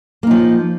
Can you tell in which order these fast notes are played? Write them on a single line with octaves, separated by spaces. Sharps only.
A#3 D#4 F3